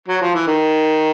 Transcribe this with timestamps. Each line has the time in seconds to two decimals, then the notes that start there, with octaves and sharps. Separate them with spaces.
0.08 F#3
0.22 F3
0.35 E3
0.47 D#3